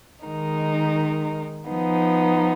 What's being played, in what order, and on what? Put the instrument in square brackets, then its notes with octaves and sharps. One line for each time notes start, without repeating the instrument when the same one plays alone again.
[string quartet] D#3 G#3 D#4 A#4
F3 B3 D#4